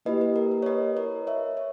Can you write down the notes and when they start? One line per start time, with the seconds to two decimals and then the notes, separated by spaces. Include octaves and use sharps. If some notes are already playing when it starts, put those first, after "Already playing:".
0.05 A#3 E4 G4 B4 D#5
0.21 B4
0.36 A#4
0.51 B4
0.62 C#5
0.66 B4 D#5
0.96 A#4 C#5
1.27 C#5 E5
1.57 C#5